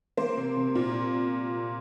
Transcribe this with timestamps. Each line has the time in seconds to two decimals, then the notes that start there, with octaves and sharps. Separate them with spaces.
0.17 A#3 C5
0.37 C3
0.57 C3
0.75 A#2